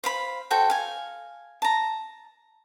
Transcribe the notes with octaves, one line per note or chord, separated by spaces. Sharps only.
C5 F5 B5
F#4 A4 C5 G5
F5 G#5
A5 A#5